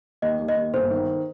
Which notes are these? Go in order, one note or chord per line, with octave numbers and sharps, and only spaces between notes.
D#2 D#5
D#2
D#5
D#2
G1 C5
D#3